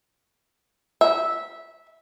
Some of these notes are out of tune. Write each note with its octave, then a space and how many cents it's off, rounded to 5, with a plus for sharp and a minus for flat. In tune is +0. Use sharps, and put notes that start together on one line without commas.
E5 -10